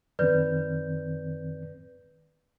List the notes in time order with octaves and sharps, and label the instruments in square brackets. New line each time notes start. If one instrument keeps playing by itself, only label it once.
[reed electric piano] F#2 D#3 C4 [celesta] B4 D5 G6